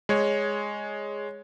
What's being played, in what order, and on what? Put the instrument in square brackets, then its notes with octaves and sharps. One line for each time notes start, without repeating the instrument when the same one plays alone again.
[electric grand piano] G#3 C#5